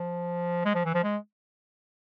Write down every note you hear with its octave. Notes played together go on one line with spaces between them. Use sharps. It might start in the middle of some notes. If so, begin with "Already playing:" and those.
Already playing: F3
G#3
F3
E3
F3
G#3